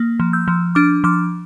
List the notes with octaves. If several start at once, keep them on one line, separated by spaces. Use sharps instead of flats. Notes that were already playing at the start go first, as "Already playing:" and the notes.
Already playing: A#3
F3
E6 G6
F3
D4 D6 F6
F3 D6 F6